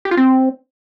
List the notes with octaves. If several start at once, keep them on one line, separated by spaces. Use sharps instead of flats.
G4
F4
C4